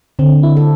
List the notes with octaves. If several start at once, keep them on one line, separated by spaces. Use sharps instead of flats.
D3 C4
E4
A4